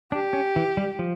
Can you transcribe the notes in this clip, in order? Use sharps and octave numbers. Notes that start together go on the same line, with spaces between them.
D4 G4
C#4
E3
G3
F3